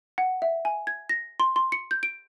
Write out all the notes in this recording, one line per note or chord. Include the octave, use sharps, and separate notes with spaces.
F#5
E5
G#5
G#6
A#6
C6
C6
C#7
G6
D7